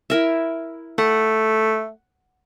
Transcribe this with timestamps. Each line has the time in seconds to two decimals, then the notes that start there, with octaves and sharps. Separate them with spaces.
0.10 E4 A#4 E5
0.98 A3 F#5